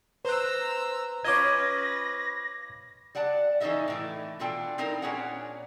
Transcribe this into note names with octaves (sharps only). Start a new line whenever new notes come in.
B4 C5 A#5 E6 F#6
C#4 F4 B4 D#5 D6 G#6 A#6
G3 D5 F#5 A5
E3 C#4 D#4 A4 D#5 E5
A2 E3 A3
B2 D4 F4 A4 G5
C4 D#4 E4 A#4
A#2 C#4 D4 G#4 C#5 F#5